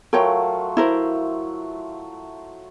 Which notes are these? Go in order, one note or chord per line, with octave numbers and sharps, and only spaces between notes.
F#3 A3 F4 A#4 C#5 G5
E4 A#4 C5